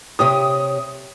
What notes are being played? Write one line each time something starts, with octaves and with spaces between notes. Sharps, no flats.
C3 G4 C#5 D#6